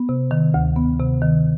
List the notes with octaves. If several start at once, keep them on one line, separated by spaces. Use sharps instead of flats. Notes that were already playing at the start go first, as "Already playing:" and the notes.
Already playing: B3
C3
D#3
D2
B3
C3
D#3